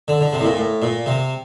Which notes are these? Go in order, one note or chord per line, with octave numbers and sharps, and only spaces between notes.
D3
D3
C3
A2
A#2
A2
A#2
C3